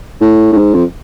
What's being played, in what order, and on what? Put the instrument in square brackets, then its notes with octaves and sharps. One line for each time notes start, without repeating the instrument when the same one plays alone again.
[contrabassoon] A2
A2
G#2
F2